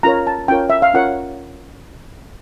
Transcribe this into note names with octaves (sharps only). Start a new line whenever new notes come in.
C#4 F4 A#4 C#5 A#5
A5
C#4 F4 A#4 C#5 G5
E5
F5
C#4 F4 A#4 C#5 F#5